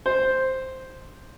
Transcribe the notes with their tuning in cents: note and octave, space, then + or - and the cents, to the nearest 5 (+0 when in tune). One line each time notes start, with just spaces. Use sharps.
C5 +0